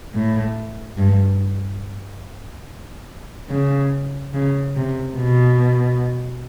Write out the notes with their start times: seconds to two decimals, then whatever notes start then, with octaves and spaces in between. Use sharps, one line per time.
0.14 A2
0.98 G2
3.50 C#3
4.34 C#3
4.76 C3
5.17 B2